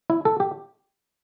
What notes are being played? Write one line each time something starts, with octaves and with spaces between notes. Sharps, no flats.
E4
A4
G4